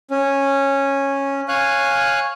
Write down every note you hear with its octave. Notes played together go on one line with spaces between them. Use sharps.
C#4
C#5 F5 G#5 F#6